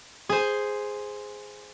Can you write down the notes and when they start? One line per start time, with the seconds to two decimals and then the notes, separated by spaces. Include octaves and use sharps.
0.29 G#4 C5